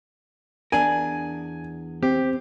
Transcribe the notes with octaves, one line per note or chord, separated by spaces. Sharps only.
E2 D4 A#4 G#5
C4 G4